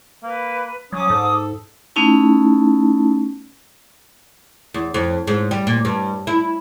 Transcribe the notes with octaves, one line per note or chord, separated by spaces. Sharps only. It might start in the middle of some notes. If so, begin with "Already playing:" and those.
A#3 B4
F#3 C#4 D6 D#6
G#2 A4
A3 B3 C#4 D#4 E4 A5
E2
F2
G#2
G3
A#2
G2
E4